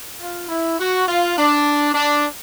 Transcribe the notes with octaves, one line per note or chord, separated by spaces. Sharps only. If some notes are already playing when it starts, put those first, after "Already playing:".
F4
E4
F#4
F4
D4
D4